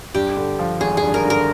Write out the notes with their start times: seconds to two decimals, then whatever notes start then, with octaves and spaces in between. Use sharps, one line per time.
0.14 G2 G4
0.37 D3
0.59 F3
0.80 G#1 G#4
0.97 G#4
1.02 G2
1.14 A#4
1.25 D3
1.30 A#4